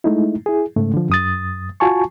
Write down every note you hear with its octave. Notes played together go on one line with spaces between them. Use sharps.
G#3 A3 D#4 E4
E4 G#4
G#2 C#3 A3
D3 F3
F#2 D#6 A6
F4 F#4 G#5 A5 C#6